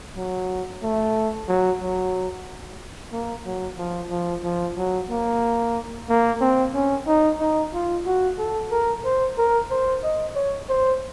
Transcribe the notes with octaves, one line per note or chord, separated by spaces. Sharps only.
F#3
A3
F#3
F#3
A#3
F#3
F3
F3
F3
F#3
A#3
A#3
C4
C#4
D#4
D#4
F4
F#4
A4
A#4
C5
A#4
C5
D#5
C#5
C5